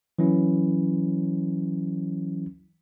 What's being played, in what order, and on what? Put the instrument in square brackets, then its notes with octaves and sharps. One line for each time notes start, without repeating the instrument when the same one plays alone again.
[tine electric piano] E3 F#3 C#4 E4